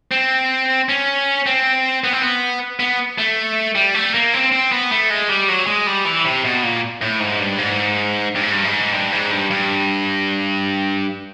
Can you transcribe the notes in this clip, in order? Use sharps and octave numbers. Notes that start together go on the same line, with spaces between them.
C4
C#4
C4
B3
C4
B3
B3
A3
G3
A3
A#3
C4
C4
B3
A3
G#3
G3
F#3
G#3
G3
E3
C3
B2
A#2
A2
G#2
G2
G#2
G2
G#2
G2
G#2
G2
G#2
G2
G2